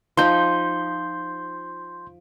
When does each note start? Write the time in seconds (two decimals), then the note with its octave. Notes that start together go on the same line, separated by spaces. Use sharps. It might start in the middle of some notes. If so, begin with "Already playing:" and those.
0.17 F3 D#4 C6 G6